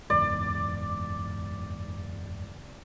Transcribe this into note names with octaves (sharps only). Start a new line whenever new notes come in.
F#1 E2 G#2 D5